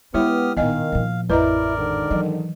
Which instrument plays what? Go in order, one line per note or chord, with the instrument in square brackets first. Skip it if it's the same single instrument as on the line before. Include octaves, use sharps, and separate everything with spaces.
[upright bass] G#3 [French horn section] B3 [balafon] E4 C#5 E5 [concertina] G4 D#6 F6
[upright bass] A1 A#2 [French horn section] D#3 [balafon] B3 D#5 G#5 [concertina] F5
[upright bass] A#2 F3
[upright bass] A1 F2 [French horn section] E4 [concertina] A#4 D5 [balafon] B4 D#5 A#5
[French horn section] G#2 D3 D#3
[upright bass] E3 [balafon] F#3